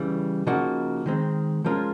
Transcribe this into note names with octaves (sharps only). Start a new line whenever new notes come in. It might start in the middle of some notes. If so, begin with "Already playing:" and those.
Already playing: C#3 E3 G3
C#3 F3 A#3 D#4 F#4
D#3 G#3 C4
F3 G#3 C#4 F4 A#4